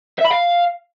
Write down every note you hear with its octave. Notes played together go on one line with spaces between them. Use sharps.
E5
B5
F5